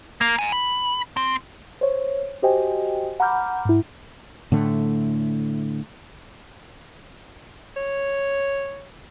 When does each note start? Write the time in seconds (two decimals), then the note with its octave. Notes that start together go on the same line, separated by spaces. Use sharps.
0.21 A#3
0.39 G#2 G#5
0.52 B5
1.17 C4
1.81 C5 C#5
2.42 F#4 G4 C5 D#5 G5 G#5
3.20 F#5 A#5 B5 D6 F6 G6
3.65 G#2 E4
4.52 A2 D3 A3
7.76 C#5